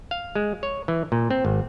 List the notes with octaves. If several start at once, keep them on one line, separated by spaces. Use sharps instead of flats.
F5
G#3
C#5
E3
A#2
C4
G#1